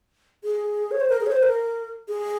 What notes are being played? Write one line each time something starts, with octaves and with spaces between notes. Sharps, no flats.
G#4
C#5
C5
A#4
G#4
C#5
C5
A#4
G#4